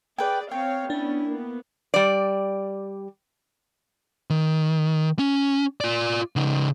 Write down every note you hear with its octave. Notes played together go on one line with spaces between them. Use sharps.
G#4 B4 D5 G5
C4 C#5 F5 G5
B3 C#4 D4 E4
A#3 B3
G3 D5
D#3
C#4
F4 D5
C#3 D#4